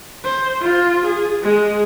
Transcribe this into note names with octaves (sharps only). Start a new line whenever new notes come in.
C5
F4
G#4
G#3